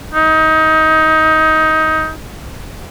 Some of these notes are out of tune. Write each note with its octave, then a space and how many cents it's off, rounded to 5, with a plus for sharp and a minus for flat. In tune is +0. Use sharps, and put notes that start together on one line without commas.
D#4 +20